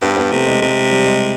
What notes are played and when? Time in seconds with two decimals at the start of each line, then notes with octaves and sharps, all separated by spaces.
0.02 G2 B3
0.17 B3
0.31 C3 A3
0.47 G#3
0.62 C3 G#3
0.91 G3
1.06 G#3